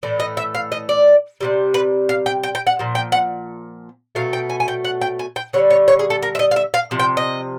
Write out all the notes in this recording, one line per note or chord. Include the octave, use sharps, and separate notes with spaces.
A2 E3 A3 D5
D#5
E5
F5
D#5
D5
C3 E3 G3
B4
F5
G5
G5
G5
F#5
A#2 F3
G5
F#5
B2 F#3 A3 F5
G5
G#5
G#5
G5
F#5
G5
G#5
G5
D3 G3 C#5
C#5
C#5
G#4
A4
A#4
E5
D#5
F5
E5
F5
C3 F3
G5
D#5